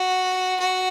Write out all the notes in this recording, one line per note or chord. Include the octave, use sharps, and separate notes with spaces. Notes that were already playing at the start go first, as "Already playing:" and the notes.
Already playing: F#4
F#4